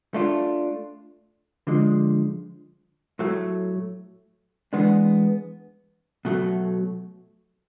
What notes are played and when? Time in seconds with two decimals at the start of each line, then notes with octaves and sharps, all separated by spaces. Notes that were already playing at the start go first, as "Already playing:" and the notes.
0.14 A3 D4 F4
1.67 D3 F3 G#3
3.19 A2 F#3 A3
4.73 E3 G#3 B3 D4
6.25 B2 F#3 A3